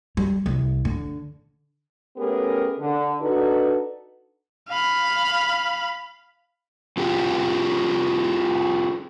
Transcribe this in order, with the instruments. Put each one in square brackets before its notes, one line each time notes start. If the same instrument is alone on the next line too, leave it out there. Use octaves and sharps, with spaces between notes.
[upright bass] G3
C2
D3
[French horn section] A3 B3 C#4 G4 G#4 A#4
D3
D4 D#4 F#4 A4 B4
[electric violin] F5 B5
[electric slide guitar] C4 F4 G4 G#4